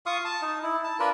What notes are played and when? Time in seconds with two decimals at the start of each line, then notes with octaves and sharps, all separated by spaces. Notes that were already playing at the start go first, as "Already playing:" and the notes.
0.06 F4 F5 C#6 D#6
0.25 A5
0.42 D#4
0.63 E4
0.84 A5
1.00 D4 F4 A#4 B4